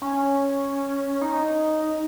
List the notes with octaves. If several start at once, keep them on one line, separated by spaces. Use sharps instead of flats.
C#4
D#4